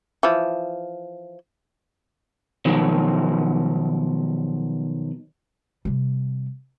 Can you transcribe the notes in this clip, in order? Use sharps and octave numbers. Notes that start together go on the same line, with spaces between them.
E3 F3
B2 D#3 F3 F#3
C3 G3